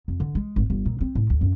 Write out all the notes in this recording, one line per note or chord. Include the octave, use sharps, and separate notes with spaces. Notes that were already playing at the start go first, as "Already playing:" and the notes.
F2
D3
G#3
G#1
G1
A#2
C4
A2
D2
F#2